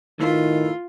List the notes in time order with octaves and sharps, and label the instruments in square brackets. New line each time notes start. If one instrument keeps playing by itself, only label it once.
[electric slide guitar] A2 E4 B4 [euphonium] D#3 [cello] F4